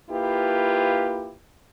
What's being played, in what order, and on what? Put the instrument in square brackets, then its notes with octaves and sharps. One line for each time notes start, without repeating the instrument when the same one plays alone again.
[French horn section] A#3 E4 F4 G4 B4